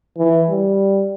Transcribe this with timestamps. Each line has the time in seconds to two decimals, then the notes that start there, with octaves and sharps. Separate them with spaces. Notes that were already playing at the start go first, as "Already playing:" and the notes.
0.18 E3
0.50 G3